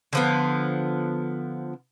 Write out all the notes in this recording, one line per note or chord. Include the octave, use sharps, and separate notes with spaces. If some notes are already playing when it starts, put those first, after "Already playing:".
D3 F3 B3